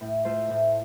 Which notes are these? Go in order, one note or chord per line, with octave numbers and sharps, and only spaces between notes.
A2
A3 F4 A4 C5
A2